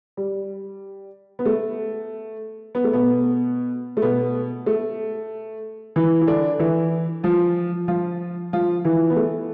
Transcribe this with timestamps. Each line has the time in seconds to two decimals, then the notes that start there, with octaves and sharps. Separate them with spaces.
0.17 G3
1.39 B3
1.46 A3
2.75 B3
2.84 A3
2.93 B2 B3
3.97 A3
4.02 B2 B3
4.66 A3
5.96 E3 E4
6.21 E4
6.27 D3 D4
6.59 E3 E4
7.23 F3 F4
7.88 F3 F4
8.53 F3 F4
8.84 E3 E4
9.10 B3
9.16 A3